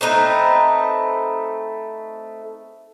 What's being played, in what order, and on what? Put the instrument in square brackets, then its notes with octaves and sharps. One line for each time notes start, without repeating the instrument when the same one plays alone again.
[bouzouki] A3 C4 D#4 B4